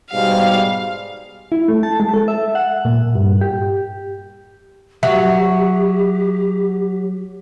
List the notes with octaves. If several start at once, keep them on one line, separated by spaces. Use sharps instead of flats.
G#2 B2 G3 F5
E4
A3
A5
G#3
A4
E5
F#5
A#2
G2
G4
F#3 G4 E5